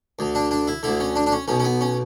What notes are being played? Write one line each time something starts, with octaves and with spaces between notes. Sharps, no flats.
D2 D3
D4
D4
E4
D2 D3 E4
C#4
D4
D4
C#4
B1 B2 C#4
C#4
B3
C#4